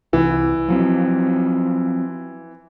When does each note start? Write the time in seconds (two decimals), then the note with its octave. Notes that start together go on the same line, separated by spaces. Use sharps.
0.13 C2 E3
0.68 F3 F#3 C4